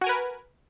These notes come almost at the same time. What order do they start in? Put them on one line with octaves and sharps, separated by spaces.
F#4 G#5 A#4 B4